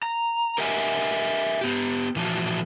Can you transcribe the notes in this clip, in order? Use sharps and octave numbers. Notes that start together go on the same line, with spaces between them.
A#5
G4 A#4 D#5 E5 F#5 G#5
B3 G4
A#2 E3 F3 F#4 A5